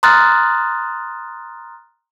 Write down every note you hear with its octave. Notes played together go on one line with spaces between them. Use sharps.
A#5 C6 D#6 F6 F#6 A6